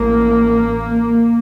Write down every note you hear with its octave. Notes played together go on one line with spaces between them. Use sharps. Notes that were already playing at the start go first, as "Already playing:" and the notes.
Already playing: A1 A2 A#3